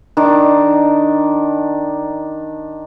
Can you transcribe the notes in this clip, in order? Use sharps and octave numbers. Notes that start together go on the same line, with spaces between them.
D#3 D4